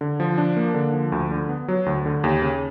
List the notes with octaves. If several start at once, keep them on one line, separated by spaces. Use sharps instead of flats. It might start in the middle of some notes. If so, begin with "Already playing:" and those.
D3
F3
D4
A#3
D3
F3
D2
D3
B3
F#3
D2
D3
D#2
C#3